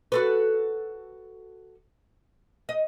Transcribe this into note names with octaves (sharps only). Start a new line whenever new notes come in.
F#4 A4 B4
D#5